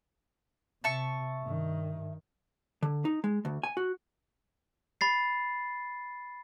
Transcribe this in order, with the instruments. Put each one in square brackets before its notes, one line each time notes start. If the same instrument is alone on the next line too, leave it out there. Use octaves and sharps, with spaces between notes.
[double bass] C3 [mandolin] E5 A5 C#6
[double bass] G2 D#3
[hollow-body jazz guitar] D3
D#4
G#3
D2
G#5
F#4
[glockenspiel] B5 A6 C7